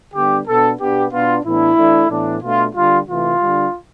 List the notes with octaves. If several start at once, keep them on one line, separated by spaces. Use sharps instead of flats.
D3 G3 B3 D4 G4
B2 B3 D4 A4
B2 B3 D4 G4
B2 B3 D4 F4
A2 E3 B3 D4 E4
E3 A3 D4
A2 E3 B3 D4
B2 A3 D4 F4
D3 G3 D4 F4
C3 E3 A3 F4
D3 G3 D4